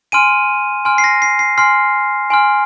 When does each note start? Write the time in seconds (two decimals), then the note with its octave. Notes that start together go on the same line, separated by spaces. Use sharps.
0.12 G#5 C6 F6 D#7
0.85 G#5 C6 F6
0.98 C7
1.04 A#6
1.22 C7
1.39 C7
1.58 G#5 C6 F6 C7
2.30 G#5 C6 F6